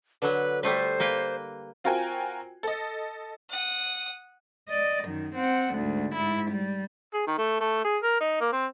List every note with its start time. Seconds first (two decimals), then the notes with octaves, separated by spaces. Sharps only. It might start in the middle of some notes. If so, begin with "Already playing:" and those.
0.22 D3 F#3 B4
0.63 G3 A3 B4 C5
1.00 A#3 B4 G5
1.84 C4 F4 F#4 A#4 G5 G#5
2.63 A4 D#5
3.50 F#5 D#6
4.69 D5 D#5
5.04 F#2 D#3
5.35 C4 F#5
5.75 D2 G#2
6.15 G#2 E4
6.51 G3
7.14 G#4
7.27 D#3
7.38 A3
7.61 A3
7.85 G#4
8.03 A#4
8.21 D#4
8.41 A#3
8.53 C4